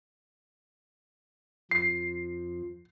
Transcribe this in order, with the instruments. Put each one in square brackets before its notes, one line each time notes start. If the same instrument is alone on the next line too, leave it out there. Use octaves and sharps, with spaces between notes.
[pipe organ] F2 F3 [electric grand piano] C7